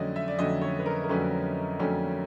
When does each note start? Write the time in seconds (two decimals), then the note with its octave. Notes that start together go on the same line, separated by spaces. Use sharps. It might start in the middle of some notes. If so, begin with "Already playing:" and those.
Already playing: F2 D3 F#3 A3 C#4 D5 D#5
0.16 E5
0.28 D5
0.38 F2 D3 F#3 A3 C#4 D#5
0.61 C#5
0.79 B4
0.86 A#4
1.04 A#4
1.09 F2 D3 F#3 A3 C#4 B4
1.79 F2 D3 F#3 A3 C#4